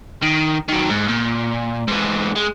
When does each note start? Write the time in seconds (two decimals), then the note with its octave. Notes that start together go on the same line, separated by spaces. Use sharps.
0.22 D#3
0.68 D#3 F#3
0.89 G#2
1.08 A#2
1.88 G#2 E3
2.36 G#3